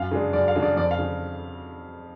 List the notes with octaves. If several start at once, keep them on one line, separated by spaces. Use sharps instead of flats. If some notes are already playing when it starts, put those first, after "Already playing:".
Already playing: F#2 F5
C#3 G#3 D4
F#2 D5
F5
C#3 G#3 D4
D5
F2 D5
F5
C#3